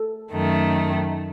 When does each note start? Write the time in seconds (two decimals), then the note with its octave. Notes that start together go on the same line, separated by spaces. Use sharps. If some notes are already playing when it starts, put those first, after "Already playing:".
Already playing: A4
0.31 F#2 D#3 A3